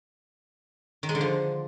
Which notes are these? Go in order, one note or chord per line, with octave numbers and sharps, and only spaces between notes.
D#3
G#3
D3
F3